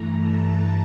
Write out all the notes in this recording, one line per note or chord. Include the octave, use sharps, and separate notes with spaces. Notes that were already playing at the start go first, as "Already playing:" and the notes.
Already playing: G2 E3 A3 A#5
A5